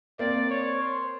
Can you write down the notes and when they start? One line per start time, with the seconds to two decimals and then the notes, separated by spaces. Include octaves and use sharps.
0.19 A#3 C4 D5
0.50 C#5
0.80 C5